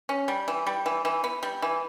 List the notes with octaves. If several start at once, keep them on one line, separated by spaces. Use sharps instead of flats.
C#4
G3
E3
G3
E3
E3
B3
G3
E3